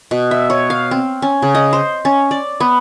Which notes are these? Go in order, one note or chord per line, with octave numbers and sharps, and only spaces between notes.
B2
E5
C#5
F5
C4
C#4
C#3
D#5
C5
C#4
D5
B3